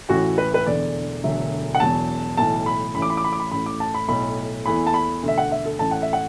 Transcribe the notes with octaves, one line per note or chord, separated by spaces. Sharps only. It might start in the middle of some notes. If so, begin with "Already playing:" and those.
A1 A2 E3 A3 F#4
B4
B4
E1 E2 D3 A3 D5
E1 D2 D3 F#3 A3 E5
F#5
E1 E2 B2 F#3 A5
B1 A2 E3 A5
B5
A1 A2 E3 B5
D6
B5
D6
B5
D6
B5
A1 A2 A3 B5
D6
A5
B5
B1 A2 A3 B5
E2 E3 A3 B5
A5
B5
E1 D2 D3
E5
F#5
E5
A4
A1 A2 A3 A5
F#5
E5
F#5